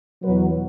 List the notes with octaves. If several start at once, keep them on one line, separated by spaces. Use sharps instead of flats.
E2 B2 F#3 B4